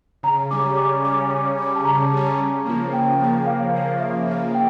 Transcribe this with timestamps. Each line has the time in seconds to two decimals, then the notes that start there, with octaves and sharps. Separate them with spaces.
0.23 C#3 A#5
0.51 G3 C#4 D6
0.77 C#3 D6
1.04 G3 C#4 D6
1.31 C#3 D6
1.58 G3 C#4
1.76 A5
1.85 C#3 A#5
2.12 G3 C#4
2.39 C#3
2.66 F3 A#3
2.92 C#3 G5
3.19 F3 A#3
3.46 C#3 F5
3.73 F3 A#3
4.00 C#3 E5
4.27 F3 A#3
4.54 G5